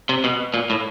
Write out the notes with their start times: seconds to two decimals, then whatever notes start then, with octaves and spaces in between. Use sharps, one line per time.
0.09 C3
0.24 B2
0.54 A#2
0.70 A2